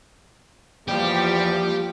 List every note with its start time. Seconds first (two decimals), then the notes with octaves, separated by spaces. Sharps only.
0.88 E2 F3 G3 A#3 G4